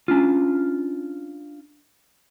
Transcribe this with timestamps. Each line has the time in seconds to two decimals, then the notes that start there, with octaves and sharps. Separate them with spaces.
0.08 C#4 D4 F4